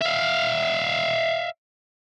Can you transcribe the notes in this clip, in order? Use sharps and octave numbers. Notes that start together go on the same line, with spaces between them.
E5 F5